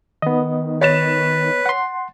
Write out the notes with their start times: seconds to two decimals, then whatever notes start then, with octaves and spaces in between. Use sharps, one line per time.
0.22 D#3 B3 D#5
0.81 B4 C#5 A6 E7
1.66 F#5 C6